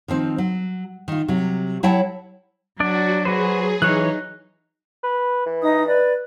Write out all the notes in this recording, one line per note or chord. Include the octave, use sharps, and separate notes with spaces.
D#3 F3 C4
F#3
D#3 F4
C3 F#3
F#3 E4 C#5 F#5 G5 A5
F#3 D4 F#4 D5
F#4 G#4 B4 C5
E3 F#3 D#4 C#5 F#6
B4
E3
D#4 D#5 D#6
B4 D5